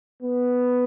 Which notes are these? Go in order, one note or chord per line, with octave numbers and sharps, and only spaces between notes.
B3